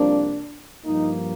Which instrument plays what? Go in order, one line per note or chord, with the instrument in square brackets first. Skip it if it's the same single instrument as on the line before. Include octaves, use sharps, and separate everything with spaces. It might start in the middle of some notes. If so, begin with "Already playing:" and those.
Already playing: [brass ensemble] C2 C3 F3 A#3 D4
G2 F3 A#3 D#4